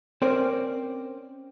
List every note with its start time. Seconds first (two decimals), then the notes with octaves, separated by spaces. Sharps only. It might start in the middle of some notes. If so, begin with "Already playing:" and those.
0.22 C4 C#4 A#4 C5 D5